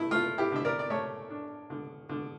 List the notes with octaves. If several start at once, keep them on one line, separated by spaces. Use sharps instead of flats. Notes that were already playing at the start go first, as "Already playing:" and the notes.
Already playing: A3 E4
A3 F4
E4 G4
D3 E5
A#4 D5
D5
A3 C#5 E5
D4
D3
D3